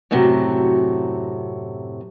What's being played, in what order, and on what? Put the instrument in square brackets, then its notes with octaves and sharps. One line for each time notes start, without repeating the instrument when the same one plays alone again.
[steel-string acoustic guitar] F#2 A2 C3 F#3